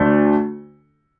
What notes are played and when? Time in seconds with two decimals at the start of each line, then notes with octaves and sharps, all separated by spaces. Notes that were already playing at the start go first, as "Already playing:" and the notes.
Already playing: D2 A3 D4